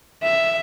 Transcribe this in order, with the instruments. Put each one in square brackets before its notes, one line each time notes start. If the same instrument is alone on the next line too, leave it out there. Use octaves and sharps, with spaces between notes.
[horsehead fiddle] E5